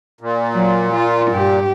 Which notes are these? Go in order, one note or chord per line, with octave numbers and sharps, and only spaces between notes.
A#2
F#3
F4
G2 G4